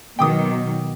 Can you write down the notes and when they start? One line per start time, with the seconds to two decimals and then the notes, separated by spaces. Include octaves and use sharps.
0.19 B2 D#3 F#3 G5 D6 D#6